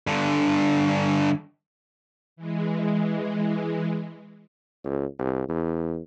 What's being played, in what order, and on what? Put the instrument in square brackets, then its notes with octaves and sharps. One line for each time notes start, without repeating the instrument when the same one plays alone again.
[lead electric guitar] G2 D3
[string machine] E3 G#3
[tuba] C#2
C2
E2